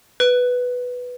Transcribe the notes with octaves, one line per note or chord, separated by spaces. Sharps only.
B4